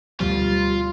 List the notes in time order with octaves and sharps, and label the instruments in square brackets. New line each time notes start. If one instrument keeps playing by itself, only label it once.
[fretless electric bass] D2 B2 F3 [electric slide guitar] G3 [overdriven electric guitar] F4